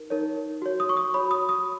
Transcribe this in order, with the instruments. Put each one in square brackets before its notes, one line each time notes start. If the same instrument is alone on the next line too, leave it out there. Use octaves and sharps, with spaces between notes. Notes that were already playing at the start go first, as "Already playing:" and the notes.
Already playing: [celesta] D#4 A#4
D#4 A#4 C#5
F#4 C#5
D#6
C#6
D#6
F#4 C#5 B5
D#6
D#6